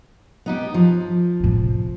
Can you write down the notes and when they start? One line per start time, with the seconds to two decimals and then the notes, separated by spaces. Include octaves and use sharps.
0.46 B3 D#4 G4
0.74 F3
1.40 A2 C3